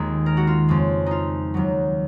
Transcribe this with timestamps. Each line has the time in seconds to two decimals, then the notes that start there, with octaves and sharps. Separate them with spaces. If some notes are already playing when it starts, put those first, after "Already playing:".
Already playing: D#2 D#3 G#3 F4 G#4
0.26 A#4
0.37 F#4
0.47 F4
0.68 F2 C#3 G#3
1.06 D#4 F4
1.54 D#2 D#3 F#3